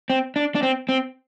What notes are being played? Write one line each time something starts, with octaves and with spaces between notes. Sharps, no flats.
C4
D4
D4
C4
C4